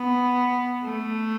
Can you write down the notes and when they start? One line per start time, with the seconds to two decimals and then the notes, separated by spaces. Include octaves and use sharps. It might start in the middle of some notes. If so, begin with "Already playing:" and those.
Already playing: B3
0.83 A3